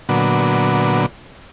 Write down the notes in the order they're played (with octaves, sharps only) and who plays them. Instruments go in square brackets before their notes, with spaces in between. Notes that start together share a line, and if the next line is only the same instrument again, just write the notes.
[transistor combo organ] A#2 D3 F#3 B3